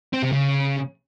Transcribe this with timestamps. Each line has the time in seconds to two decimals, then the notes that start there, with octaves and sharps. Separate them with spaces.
0.13 C4
0.23 C3
0.33 C#3